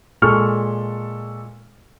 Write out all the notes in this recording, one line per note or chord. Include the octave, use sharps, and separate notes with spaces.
A#2 G#3 A4 C#6 F6